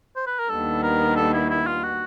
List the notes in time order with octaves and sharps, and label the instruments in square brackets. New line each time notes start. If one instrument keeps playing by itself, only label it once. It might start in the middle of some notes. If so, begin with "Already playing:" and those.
[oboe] C5
B4
A#4
[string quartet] D#2 D#3 G3 B3 D4 [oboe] A4
[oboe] A#4
A4
E4
E4
F4
F#4